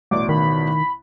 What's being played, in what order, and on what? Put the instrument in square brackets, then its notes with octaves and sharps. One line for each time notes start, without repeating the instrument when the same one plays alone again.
[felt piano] A1 B2 D5 [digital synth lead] D6
[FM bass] D#3 [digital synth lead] B5